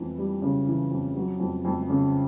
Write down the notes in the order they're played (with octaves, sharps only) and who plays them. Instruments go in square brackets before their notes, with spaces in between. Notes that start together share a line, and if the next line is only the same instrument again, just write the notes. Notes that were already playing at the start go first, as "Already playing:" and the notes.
Already playing: [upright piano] F2 E3
G3
C#3
E3
F2
F#3
F2
F2
C#3